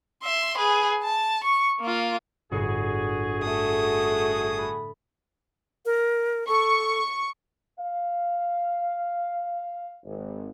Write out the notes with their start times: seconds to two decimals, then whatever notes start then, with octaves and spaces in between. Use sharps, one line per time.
0.24 E5 C6
0.57 G#4 B4
1.04 A5
1.44 C#6
1.81 A#3 F4
2.51 G1 A2 F#4 G#4
3.43 A3 D#6
4.57 B5 F#6 A6
5.85 A#4
6.48 A4 C#6
7.79 F5
10.04 G#1